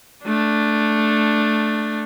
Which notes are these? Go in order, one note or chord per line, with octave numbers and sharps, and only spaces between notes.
A3 D4